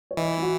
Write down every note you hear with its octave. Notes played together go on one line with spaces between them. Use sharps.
C#5
E3 D#5
E4
F#4